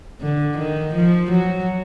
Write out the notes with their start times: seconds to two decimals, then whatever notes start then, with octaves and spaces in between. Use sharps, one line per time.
0.21 D3
0.58 D#3
0.95 F3
1.32 F#3